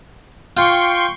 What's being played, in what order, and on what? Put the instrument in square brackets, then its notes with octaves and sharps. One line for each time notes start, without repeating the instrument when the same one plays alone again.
[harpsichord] F4 [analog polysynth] G5 C6 C#6